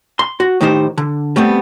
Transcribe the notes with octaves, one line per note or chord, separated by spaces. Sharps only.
C6
F#4
A2 D#3 D#4 G4 C5
D3
G3 A3 B3 C4